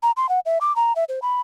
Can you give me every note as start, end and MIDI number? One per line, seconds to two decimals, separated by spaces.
0.03 0.11 82
0.17 0.29 84
0.29 0.40 78
0.46 0.59 76
0.61 0.75 86
0.76 0.93 82
0.96 1.04 76
1.09 1.19 72
1.22 1.41 83